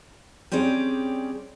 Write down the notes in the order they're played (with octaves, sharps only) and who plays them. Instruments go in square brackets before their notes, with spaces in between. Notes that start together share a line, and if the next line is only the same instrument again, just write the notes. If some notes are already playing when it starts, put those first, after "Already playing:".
[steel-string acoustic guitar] G3 C4 C#4 G#4 D5